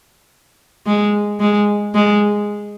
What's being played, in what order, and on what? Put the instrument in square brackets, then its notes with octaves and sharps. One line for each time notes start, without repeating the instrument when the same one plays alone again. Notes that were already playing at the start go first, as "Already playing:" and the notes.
[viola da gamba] G#3
G#3
G#3